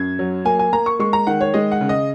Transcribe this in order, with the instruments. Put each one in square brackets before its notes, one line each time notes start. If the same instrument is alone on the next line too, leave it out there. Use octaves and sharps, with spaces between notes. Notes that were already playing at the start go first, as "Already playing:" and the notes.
Already playing: [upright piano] F#2 G#6
F#3
A#3 G#5
G#5
A#3 A#5
C#6
G#3 C#6
A#5
D#3 F#5
C#5
G#3 D#5
F#5
C#3
D#5